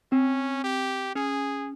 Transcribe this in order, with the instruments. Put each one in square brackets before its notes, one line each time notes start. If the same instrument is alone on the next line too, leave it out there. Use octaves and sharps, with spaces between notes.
[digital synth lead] C4 [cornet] C#4
[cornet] G4
[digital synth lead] C#4 [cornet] G#4